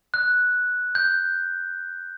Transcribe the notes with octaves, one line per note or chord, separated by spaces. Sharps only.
F#6
G6